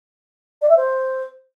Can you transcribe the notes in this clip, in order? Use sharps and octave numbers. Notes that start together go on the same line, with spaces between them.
D5
E5
C5